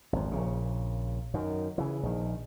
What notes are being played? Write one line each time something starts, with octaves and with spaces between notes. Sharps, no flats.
G#1 F2
A#1 A#2 C#3
F#2 D#3
C#3 E3
A#1 D#3